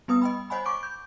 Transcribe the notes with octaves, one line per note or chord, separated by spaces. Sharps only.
G3 B3 B4 D#6
D#5 G5 B5
C5 C#5 D#5 F#5 G#5 B5
C#6 D6 D7
G6